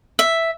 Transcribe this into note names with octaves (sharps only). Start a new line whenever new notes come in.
E5